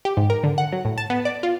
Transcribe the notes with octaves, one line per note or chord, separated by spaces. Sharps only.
G4
G#2
A#4
D3
F#5
F#3
A2
A5
B3
D5
F4